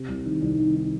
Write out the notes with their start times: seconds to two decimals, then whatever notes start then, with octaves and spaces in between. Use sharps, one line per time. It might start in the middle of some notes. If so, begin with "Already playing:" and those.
Already playing: C3
0.08 C2
0.26 D#3
0.42 C2
0.58 D#3
0.75 D#3